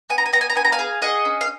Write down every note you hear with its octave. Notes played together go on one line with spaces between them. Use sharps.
B3 G#5
A#5
G#5
B3 A#5
G#5
A#5
B3 G#5
A#5
F5 G#5
G#4
G#4 D#5 F#5
C#4
F5